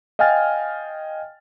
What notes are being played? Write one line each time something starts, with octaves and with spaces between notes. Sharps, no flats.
D#5 F5 G5 G#5 F6 A6